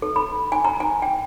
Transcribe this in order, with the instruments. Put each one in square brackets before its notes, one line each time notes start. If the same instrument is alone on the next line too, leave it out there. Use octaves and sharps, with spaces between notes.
[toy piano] A4
B5
G#5
A#5
G#5
G5